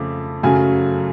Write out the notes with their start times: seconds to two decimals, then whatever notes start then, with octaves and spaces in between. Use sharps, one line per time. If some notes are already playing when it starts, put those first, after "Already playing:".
Already playing: F2 C#3 A3 D6
0.43 F#2 C#3 F#3 A3 G#5